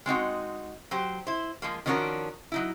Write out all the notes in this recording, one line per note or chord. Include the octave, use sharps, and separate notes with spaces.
G#3 C4 D#4 F#4
F#3 G4 C5
E4 C5
F3 G#3 A#3
D#3 F3 C#4 D4 F#4 A#4
F#3 D#4 E4